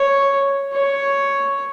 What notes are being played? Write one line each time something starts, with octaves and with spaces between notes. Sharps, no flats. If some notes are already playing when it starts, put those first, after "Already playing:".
Already playing: C#5
C#5